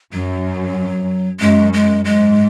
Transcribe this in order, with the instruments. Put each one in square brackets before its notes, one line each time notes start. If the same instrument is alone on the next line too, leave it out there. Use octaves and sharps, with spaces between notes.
[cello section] F#2 [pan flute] F#3
[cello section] F#2 [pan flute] G#3
[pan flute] G#3
[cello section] G#2 [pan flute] G#3